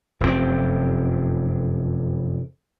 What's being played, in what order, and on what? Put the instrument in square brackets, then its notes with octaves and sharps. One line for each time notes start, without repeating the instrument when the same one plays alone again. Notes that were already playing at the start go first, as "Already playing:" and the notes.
[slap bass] F1 F#2 A#2 C4